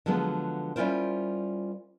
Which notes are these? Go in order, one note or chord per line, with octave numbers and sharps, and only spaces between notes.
D3 F3 F#3 G#3 B3
G3 C#4 E4 F4 A#4 C5